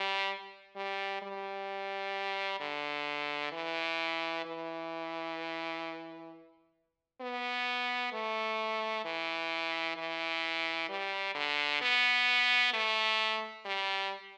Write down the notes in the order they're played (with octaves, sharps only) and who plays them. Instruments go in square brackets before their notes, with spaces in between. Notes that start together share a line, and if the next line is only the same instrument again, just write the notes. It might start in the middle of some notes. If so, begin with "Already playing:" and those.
Already playing: [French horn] G3
G3
G3
D3
E3
E3
B3
A3
E3
E3
G3
D3
B3
A3
G3